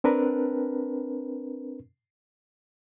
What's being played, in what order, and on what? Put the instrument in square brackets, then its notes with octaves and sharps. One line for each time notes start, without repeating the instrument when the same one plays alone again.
[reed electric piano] C4 D4 A#4 B4